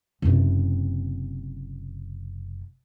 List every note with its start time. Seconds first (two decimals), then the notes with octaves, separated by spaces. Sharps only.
0.22 F#1 C3